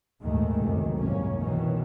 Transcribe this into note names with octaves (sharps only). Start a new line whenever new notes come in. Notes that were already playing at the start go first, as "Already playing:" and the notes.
A#1 D#2 G#2 D#3 G#3 A3
C#2 F#2 C3 D#3
C2 G#2 A#3 C#4
B2 D#3 E3 C#4